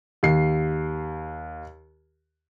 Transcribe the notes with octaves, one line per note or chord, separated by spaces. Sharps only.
D#2 C7